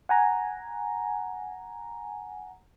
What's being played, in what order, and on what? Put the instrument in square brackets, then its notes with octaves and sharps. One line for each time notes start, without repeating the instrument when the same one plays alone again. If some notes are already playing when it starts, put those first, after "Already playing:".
[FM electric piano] F#5 G#5 A#5